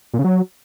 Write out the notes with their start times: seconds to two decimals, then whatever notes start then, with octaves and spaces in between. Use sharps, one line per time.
0.14 A#2
0.19 C#3
0.24 F#3